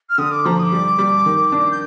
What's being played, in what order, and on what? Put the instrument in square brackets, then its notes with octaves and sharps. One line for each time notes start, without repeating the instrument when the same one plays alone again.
[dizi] F6
[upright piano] D3 [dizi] D#6
[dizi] D6
[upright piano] F3 [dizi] A#5
[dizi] D#6
D6
[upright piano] G3
G3
D#3
D4
[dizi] G6